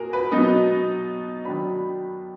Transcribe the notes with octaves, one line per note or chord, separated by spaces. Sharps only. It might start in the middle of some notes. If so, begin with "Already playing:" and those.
Already playing: A#2 F#4 G#4 A#4
B4
B2 F#3 B3 D#4 D#5
D#3 F#3 D4 B5